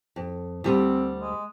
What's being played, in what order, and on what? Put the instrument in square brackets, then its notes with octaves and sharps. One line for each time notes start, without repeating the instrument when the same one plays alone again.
[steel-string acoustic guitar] F2
[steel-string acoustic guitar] D2 G3 [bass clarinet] C4
[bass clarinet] G#3